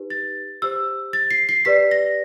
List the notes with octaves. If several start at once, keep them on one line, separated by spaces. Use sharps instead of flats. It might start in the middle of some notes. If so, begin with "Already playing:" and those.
Already playing: D#4 G4 B4
A6
G4 C5 E6
A6
C7
C7
G4 B4 D5 B6
A#6